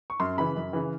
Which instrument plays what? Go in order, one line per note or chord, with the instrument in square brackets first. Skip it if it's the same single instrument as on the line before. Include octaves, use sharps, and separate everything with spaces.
[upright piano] C#6
F#2 C6
C#3 E3 B5
F#2
C#3 E3